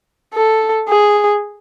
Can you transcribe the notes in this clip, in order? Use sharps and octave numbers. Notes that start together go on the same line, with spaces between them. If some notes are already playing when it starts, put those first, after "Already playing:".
A4
G#4